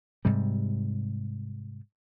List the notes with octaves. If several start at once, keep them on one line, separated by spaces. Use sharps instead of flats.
G#2 C3 G3